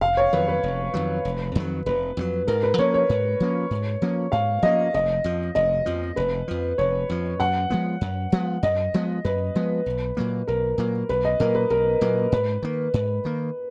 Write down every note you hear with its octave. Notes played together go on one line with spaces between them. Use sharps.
F1 F5
C#5
F2 D#3 F#3 B4
B4
F1
F2 D#3 F#3
F1
F2 D#3 F#3
F1 B4
F2 D#3 F#3
G#2 A#4
B4
F3 A#3 C#4 C#5
C#5
G#2
F3 A#3 C#4
G#2
F3 A#3 C#4
G#2 F5
F3 A#3 C#4 D#5
F1 D#5
F2 F3
F1 D#5
F2 F3
F1 B4
F2 F3
F1 C#5
F2 F3
F#2 F#5
F3 G#3 B3
F#2
F3 G#3 B3
F#2 D#5
F3 G#3 B3
F#2 B4
F3 G#3 B3
B1
A#2 F#3 A#3
B1 A#4
A#2 F#3 A#3
B1 B4
D#5
A#2 F#3 A#3 A#4
B4
B1 A#4
A#2 F#3 A#3
G#2 B4
D#3 A#3
G#2
D#3 A#3